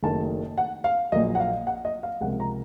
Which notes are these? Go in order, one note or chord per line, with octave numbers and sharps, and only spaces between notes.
F#1 F#2 D#3 A3 A5
F#5
F5
A#1 A#2 F#3 D#5
F#5
F5
F#5
D#5
F5
C#2 C3 F3 A#3 F#5
A#5